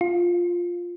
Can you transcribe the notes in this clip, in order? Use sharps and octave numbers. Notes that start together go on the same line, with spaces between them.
F4